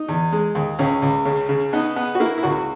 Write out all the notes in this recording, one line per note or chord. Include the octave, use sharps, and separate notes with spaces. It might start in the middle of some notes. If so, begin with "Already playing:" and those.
Already playing: D#4
E2
G#3
D#2
C#2 C#4
C#2
C#3
C#3
B3 D#4
B3
F#4
A#3 E4
E4
C#2 F#4